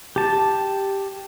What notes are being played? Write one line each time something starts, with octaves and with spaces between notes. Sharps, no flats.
G4 A5